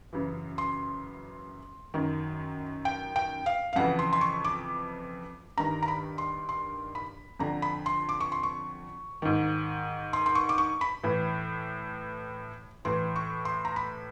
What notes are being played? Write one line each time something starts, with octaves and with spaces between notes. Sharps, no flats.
F#2 C#3 E3
C6
F#2 D#3
G5
G5
F5
F5
F2 C#3 E3 F#5
C6
C6
C#6
D6
G2 D#3 A#5
A#5
B5
C6
C6
B5
F2 D3 A#5
B5
C6
D6
C#6
C6
C#6
G#2 D#3
C6
C6
C#6
D6
C#6
B5
A2 E3
A2 E3 C6
C#6
C6
A#5
B5